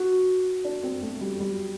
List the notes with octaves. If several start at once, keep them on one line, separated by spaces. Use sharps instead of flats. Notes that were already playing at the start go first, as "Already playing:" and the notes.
Already playing: F#4
D4
C4
A3
G3
G3
F#3